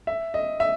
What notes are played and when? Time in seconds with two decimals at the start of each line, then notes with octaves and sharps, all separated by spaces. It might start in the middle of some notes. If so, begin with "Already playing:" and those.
0.07 E5
0.34 D#5
0.60 E5